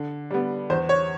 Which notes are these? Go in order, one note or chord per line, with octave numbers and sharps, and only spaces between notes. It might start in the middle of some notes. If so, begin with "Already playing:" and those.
Already playing: D3
G3 B3
E2 C5
C#5